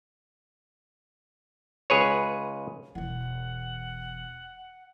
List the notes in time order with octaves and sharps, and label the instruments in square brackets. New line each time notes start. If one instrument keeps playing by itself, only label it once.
[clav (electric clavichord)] C#2 G#4 B4 C#5
[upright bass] E1 E3 [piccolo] F#5